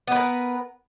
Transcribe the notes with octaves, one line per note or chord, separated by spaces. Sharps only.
B3 A#4 B4